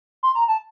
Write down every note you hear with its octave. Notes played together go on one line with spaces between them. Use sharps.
C6
A#5
A5